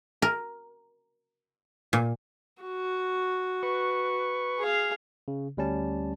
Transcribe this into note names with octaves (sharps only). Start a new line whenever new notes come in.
A#4
A#2
F#4
B4 C#6
G#4 F5
C#3
D2 G3 C#4 A5